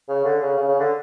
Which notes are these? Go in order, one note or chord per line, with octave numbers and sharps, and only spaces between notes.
C#3
D3
C#3
C#3
C#3
D3